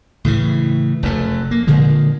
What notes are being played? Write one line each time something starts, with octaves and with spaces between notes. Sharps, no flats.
A2 C#3 E3
F1 F#2 A3
A#3
A#2 D3 F3 G#3